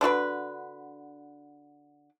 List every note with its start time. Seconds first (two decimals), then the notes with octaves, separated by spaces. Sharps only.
0.01 D3 D4 F#4 B4